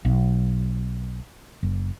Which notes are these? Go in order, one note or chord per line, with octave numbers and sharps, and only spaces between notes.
B1
F#1